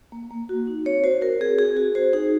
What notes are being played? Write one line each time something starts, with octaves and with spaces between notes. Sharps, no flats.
A#3
A#3
F#4
D#4
C4 C#5
F#4 C5
F#4 A#4
C4 G#4
C4 G#4
F#4 G#4
F#4 C5
D#4 G#4